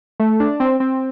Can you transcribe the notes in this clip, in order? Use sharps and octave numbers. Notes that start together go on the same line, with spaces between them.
A3
D4
C4
C4